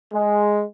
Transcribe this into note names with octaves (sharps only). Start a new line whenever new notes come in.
G#3